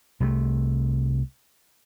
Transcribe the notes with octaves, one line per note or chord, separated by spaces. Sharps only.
C2 C3 G3 A3